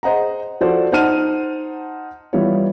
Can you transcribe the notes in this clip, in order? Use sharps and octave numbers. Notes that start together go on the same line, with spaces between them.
G#4 C5 D#5 F#5 A#5
F3 F#4 A4 C5 D5
D#4 C5 F#5 A5 F6 D#7
E3 G3 B3 E4 F4 C#5